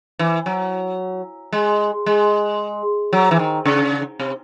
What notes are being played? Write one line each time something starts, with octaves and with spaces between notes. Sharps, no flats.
E3
F#3
G#3
G#3
F#3
E3
D#3
C#3
C3